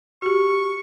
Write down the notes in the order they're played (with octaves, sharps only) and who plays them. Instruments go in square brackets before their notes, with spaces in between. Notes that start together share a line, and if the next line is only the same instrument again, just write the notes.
[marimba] F#4 G4 [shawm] C#6